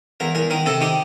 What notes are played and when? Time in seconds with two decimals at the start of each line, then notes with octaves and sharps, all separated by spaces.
0.20 E2 A#4
0.35 E2 A#4
0.50 D#3 A#4
0.66 C3 A4
0.81 D#3 G4